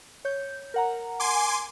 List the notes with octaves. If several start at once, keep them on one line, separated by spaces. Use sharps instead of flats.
C#5 G6
A#4 F#5 A#5
G#5 C6 D6